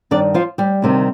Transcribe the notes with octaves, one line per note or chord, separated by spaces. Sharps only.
G2 D#3 D4 D5
F3 F4
G3 G4
D2 C3 D#3